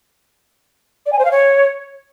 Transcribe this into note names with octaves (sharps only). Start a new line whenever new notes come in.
D5
G#5
C5
F5
C#5